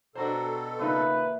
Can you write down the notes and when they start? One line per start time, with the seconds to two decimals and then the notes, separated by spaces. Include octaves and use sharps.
0.15 B2 D4 F#4 G4 A4 C5 A#5
0.79 A#2 C#3 E3 D#4 B4 E5